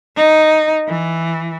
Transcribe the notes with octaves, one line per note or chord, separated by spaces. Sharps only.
D#4
E3